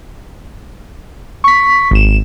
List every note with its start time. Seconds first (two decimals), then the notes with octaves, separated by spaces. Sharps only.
1.44 C#6 B6
1.91 G#1 E7